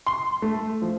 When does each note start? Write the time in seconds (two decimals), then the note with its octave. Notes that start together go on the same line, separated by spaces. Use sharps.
0.06 C6
0.42 A3
0.82 F3